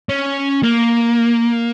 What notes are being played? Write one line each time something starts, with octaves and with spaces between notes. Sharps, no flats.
C#4
A#3